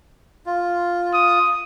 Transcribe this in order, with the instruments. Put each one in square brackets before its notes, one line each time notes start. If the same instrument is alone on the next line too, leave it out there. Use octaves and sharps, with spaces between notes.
[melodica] F4
[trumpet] D#6